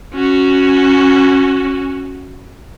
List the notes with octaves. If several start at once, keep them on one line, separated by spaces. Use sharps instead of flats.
C#4 F#4